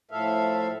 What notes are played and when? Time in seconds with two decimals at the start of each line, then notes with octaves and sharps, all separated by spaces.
0.11 A2 F3 A4 E5 F5